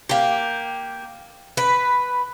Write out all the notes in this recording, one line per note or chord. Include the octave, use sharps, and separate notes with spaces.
A#3 G4
B4